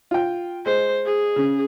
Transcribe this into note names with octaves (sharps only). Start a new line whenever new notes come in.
F4 G5
G#3 C5
G#4
C#3